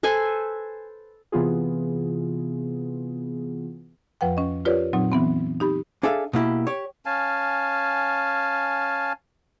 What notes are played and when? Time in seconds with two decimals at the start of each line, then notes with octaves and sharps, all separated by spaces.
0.03 A4 B4 C5 G#5
1.32 C3 E3 B3 F4 G#4
4.21 F2 F3 B4 F#5 G5
4.37 C#4 D#5
4.65 F4 G4 A#4 B4 C#5 D5
4.93 A#2 F#3 C4 D#4
5.11 E3 B3 C4
5.60 D#4 G4 B5
6.03 D4 G#4 A4 E5 F5
6.33 B2 A#3 E4 G4
6.67 G4 C#5
7.06 C#4 F5 G#5 A5